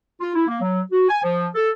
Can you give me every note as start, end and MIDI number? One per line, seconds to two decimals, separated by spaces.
0.21 0.33 65
0.35 0.44 64
0.48 0.58 58
0.61 0.80 54
0.91 1.07 66
1.09 1.22 80
1.23 1.48 53
1.55 1.69 69